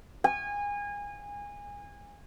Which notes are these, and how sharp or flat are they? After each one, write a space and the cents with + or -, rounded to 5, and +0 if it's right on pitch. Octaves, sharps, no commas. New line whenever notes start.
G#5 -25